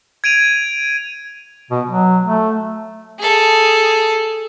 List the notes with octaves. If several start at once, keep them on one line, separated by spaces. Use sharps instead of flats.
G#6 D7 D#7 F7
B2
F#3
A3
G#4 A4